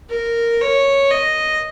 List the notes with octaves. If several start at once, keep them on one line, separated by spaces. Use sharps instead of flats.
A#4
C#5
D#5